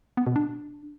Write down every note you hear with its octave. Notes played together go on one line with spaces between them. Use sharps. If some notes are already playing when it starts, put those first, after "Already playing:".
B3
B2
D4